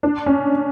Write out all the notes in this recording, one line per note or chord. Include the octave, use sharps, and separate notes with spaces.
D4
C#4